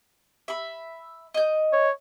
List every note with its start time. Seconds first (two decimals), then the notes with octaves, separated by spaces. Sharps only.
0.48 E5 B5
1.34 D#5 G6
1.72 C#5